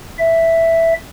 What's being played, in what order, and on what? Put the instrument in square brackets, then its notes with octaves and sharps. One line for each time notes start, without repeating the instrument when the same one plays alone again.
[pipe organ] E5